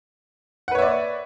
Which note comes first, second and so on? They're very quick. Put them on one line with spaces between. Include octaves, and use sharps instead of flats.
F#5 B4 C#5 E5 D5